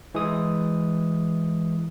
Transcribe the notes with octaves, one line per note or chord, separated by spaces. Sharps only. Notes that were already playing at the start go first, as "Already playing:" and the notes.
E3 G#3 D#6